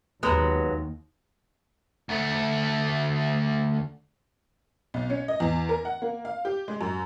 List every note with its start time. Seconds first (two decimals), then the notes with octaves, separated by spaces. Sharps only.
0.23 D#2 F#3 G#3 B3
2.09 D2 A3
4.94 B1
5.10 C#4
5.28 D#5
5.40 E2
5.69 A#4
5.85 F#5
6.02 A#3
6.25 F5
6.45 G4
6.68 G#3
6.81 F#2